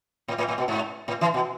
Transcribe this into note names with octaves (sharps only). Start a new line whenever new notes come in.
A2
A2
A2
B2
G#2
A2
E3
B2